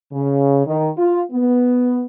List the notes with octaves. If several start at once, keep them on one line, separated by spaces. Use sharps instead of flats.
C#3
D#3
F4
B3